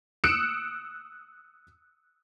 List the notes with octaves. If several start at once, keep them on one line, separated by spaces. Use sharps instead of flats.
D#6 E6 F#6 C#7 D7 E7